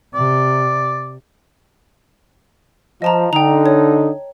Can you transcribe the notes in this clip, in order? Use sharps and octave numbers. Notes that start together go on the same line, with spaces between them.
C3 D5
F3 D#5 A5 A#5
D3 D#4 G5 A#5
C#5